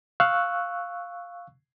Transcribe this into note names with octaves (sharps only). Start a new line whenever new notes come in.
F5 C#6 E6 F#6